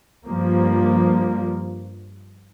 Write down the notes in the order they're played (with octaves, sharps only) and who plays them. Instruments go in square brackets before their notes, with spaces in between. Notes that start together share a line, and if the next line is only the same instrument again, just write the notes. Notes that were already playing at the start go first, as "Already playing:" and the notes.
[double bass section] G2 F3 A#3